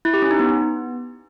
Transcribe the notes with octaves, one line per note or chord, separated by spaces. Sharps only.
E4
G4
C#4
D#4
B3